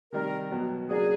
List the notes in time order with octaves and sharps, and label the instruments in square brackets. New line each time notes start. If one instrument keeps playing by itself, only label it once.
[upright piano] C3 D#3 G3 [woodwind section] A#4
[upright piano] B2 F#3 B3
[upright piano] C#3 F#3 A#3 D4 F#4 [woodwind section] G#4